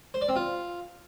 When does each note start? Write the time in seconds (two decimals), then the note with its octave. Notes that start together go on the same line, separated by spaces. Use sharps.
0.14 C5
0.21 D5
0.29 C4
0.36 F4